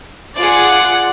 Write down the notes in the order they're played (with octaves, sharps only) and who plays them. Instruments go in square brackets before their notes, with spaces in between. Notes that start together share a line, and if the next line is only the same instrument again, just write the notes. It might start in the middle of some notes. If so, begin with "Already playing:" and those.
[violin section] F4 G#4 [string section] D5 F#5